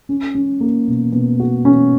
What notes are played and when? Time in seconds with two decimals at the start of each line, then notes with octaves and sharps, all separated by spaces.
0.09 C#4
0.35 C#4
0.60 A#3
0.87 B2
1.12 B2
1.40 F#4
1.65 C#4